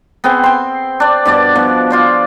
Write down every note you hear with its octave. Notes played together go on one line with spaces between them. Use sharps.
B3 C4 G#4 G5
G5 C6
D4 D5
G2 B2 D5
B2 F3
F4 C5 D5